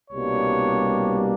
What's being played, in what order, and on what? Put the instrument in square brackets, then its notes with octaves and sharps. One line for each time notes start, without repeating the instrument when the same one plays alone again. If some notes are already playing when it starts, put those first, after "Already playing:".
[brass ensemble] C2 B2 G3 A#3 D4 C#5